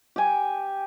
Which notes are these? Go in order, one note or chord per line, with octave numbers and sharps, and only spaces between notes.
G4 G#5